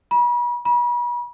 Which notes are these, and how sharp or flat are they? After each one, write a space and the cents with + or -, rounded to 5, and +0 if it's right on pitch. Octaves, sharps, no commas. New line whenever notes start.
B5 -40
B5 -40